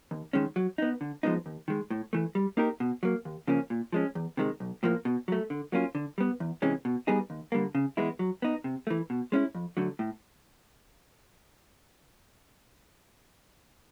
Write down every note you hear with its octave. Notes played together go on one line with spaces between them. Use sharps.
D#2
D#3 G#3 C#4
F#3
B3 D#4
D3
F3 G#3 B3 D#4
D#2
D#3 G#3
A2
E3 A3
G3
A#3 D#4 G4 A#4
B2
F#3 A#3
D#2
C#3 F3 A#3 C#4
A#2
F3 G#3 C#4
E2
C3 D#3 G#3
B1
A2 F3 A#3
B2
F#3 A3
D3
F#3 A#3 C#4 F4
D3
G3 B3
E2
C3 E3 G#3 C#4
B2
G3 B3 D#4 G#4
D#2
D3 G3 A#3
C#3
E3 G#3 B3 E4
F#3
B3 D#4
C3
E3 A3
B2
G#3 C#4 E4
F2
D3 F#3 A3
A2